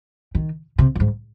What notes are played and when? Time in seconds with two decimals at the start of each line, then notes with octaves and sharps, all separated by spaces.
0.35 D#3
0.78 C3
0.95 F2
1.00 G#2